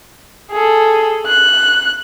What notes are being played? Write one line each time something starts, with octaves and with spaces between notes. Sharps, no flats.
G#4 A4
F#6